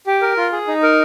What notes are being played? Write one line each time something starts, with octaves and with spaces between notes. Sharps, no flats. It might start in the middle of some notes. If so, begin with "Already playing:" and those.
G4
A#4
F4
G#4
D#4
A#4